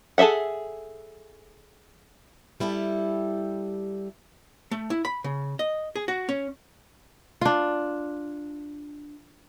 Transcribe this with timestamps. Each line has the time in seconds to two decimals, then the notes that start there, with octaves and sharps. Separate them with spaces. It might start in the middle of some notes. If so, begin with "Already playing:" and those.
0.18 G#4 A4 D#5 E5 F#5
2.60 G3 E4 G4 A4
4.71 A3
4.90 E4
5.05 B5
5.24 C#3
5.59 D#5
5.96 G#4
6.08 F#4
6.29 C#4
7.41 D4 F4